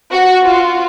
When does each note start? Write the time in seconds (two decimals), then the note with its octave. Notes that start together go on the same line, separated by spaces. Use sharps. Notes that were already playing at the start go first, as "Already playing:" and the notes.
0.11 F#4
0.44 F4